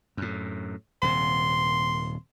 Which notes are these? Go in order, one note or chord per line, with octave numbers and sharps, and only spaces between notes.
F#2 A2
D#1 C3 C6